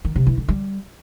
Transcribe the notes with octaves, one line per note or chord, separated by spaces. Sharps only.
D#3
C3
E3
D3
G3